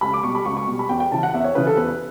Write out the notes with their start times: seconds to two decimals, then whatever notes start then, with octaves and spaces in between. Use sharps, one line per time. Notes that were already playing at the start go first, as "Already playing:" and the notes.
0.01 C#2 B5
0.13 D6
0.23 B2 G3 C#6
0.35 B5
0.45 C#2 C#6
0.57 C#6
0.67 B2 G3
0.79 B5
0.89 E2 G5
1.00 G5
1.12 C#3 E3 A5
1.23 F#5
1.34 E2 E5
1.44 C#5
1.55 C#3 E3 B4
1.67 A4
1.77 E2 B4